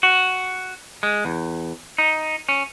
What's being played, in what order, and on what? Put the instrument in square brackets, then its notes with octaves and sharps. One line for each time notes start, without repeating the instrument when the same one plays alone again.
[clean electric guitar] F#4
G#3
E2
D#4
C#4